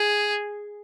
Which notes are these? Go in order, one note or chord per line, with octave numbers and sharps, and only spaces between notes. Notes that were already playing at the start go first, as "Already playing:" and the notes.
Already playing: G#4